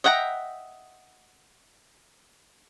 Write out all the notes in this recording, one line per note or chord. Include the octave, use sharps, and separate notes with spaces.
D#5 E5 F#5 G5 A#5